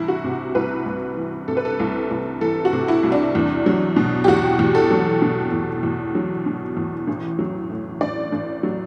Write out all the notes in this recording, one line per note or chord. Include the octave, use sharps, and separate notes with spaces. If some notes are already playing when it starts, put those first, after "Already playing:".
Already playing: C2 E3 E4
F#4
C3
C2 B4
C2
E3
C3 A4
B4
A4
C2
C2
E3 A4
F#4
C3
E4
C2
D4
E2
F#3
B2
G4
E2 F#4
E2
A4
F#3
B2
E2
E2
F#3
B2
E2
A1
F#3
A2
A1 D5
A1
F#3